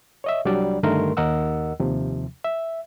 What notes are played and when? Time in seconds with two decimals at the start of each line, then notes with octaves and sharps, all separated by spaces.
0.24 C#5 D#5 E5
0.45 C2 F#3 G3 D4 D5
0.83 G2 D3 D#3 A3 A#4 C6
1.17 D#2 A#4 D#5 F#5 E6
1.80 D#2 C3 F3
2.44 E5